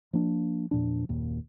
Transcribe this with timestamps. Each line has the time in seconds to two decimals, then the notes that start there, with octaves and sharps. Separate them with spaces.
0.13 F3 A#3 D4
0.71 E2 A#2 F3 D4
1.09 F#1 D#2 A#2